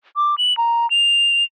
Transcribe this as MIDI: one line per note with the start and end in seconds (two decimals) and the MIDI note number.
0.16 0.35 86
0.38 0.56 102
0.58 0.89 82
0.90 1.44 101